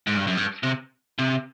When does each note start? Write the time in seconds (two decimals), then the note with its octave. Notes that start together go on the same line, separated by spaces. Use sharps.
0.07 G#2
0.17 G2
0.27 F#2
0.37 G2
0.63 C3
1.19 C3